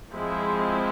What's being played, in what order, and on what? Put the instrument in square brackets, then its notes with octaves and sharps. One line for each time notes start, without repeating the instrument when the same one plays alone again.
[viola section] F3 G#3 C4 E4